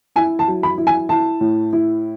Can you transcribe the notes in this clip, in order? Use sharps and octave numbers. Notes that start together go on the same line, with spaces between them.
E4 G#5
A5
F#3
B5
E4
G#5
E4 A5
A2
E4